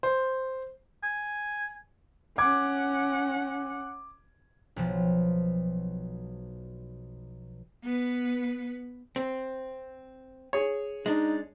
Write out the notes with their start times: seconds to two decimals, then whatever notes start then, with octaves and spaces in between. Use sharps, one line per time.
0.03 C5
1.03 G#5
2.38 C#4 F#5 D6 G#6
4.76 B1 B2 F3
7.83 B3 B4
9.16 C4
10.53 G#4 C#5
11.06 G#3 D4 D#4